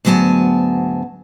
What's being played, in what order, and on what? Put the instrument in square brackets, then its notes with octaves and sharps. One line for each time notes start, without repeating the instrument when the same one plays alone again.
[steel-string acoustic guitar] D2 G#2 F#3 B3 G#5 A5